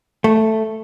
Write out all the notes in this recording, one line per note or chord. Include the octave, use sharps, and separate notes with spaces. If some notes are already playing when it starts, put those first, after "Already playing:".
A3